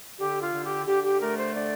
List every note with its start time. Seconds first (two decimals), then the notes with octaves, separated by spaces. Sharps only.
0.19 D3 G4
0.42 F4
0.53 D3
0.65 G4
0.86 D3 G4
1.04 G4
1.20 A3 A#4
1.37 C5
1.54 D3 D5